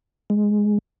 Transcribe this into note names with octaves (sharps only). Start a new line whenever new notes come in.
G#3